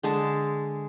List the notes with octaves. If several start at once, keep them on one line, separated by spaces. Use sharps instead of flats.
D3 G#3 A5